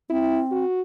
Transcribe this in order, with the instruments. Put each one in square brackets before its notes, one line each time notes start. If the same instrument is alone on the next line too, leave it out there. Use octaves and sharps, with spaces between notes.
[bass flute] C4 [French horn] E4
[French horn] F#4